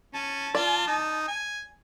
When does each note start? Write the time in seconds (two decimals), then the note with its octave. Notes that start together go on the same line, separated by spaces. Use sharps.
0.14 C#4 A5
0.55 F4 D5
0.87 D#4
1.28 G#5